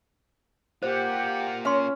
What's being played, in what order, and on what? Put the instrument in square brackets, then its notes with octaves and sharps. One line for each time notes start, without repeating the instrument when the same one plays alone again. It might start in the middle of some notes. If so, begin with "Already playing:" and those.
[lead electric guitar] A#3 F4 [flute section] G4 F#5 [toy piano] C5
[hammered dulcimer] C#4 [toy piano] F5 C6